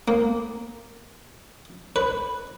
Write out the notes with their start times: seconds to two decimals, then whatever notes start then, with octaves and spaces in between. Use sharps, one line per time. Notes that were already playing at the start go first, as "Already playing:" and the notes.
0.08 A#3
1.96 B4